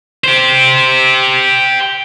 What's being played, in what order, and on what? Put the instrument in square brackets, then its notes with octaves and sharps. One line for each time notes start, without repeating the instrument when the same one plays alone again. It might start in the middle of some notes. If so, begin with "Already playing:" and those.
[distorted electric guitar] G4 C5